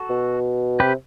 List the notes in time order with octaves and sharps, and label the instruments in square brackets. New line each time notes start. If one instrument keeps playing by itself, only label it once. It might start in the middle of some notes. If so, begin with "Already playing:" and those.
Already playing: [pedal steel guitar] F#4 A4
[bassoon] B2
[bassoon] C3 [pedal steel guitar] G4 B4